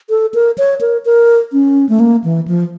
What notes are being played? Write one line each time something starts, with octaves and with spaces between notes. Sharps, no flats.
A4
A#4
C#5
A#4
A#4
C#4
A3
A#3
E3
F3